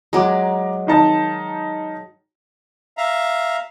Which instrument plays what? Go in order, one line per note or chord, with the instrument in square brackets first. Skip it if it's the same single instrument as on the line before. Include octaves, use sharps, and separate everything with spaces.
[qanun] F#3 G#3 [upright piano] A#5 D6
[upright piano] D#3 D#4 A5
[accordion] E5 F5 A#5